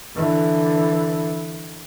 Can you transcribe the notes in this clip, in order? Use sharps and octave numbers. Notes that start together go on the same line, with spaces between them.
D3 E3